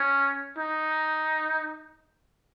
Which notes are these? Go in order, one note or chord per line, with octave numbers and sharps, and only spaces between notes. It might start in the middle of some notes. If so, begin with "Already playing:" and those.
Already playing: C#4
D#4